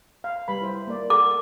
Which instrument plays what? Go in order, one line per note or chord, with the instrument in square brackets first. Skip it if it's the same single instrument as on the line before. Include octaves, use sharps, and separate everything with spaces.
[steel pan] F5
G3 B4 B5
E4 C5
A#3 A#4 D5
[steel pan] A4 A#4 F#5 [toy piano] D6